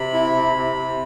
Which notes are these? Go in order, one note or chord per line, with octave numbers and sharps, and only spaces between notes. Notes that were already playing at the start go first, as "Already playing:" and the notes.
Already playing: C3 B5
E4
C3
C3
C3